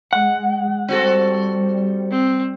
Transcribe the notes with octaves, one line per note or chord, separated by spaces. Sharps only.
G#3 F#5
G3 C4 F#4 A4
C4